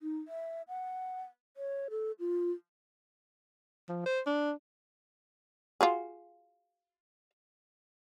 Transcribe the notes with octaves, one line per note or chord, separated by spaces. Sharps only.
D#4
E5
F#5
C#5
A4
F4
F3
C5
D4
F4 F#4 G#4